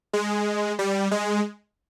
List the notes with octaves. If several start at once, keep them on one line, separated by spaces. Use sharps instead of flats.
G#3
G3
G#3